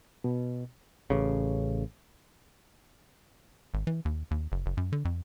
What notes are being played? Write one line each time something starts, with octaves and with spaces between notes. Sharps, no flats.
B2
A1 C#3
G#1
E3
D#2
D#2
F#1
F#1
F#2
D3
F2